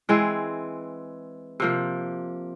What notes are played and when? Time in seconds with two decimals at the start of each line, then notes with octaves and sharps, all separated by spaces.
0.09 E3 G#3 C4
1.60 C3 F3 A#3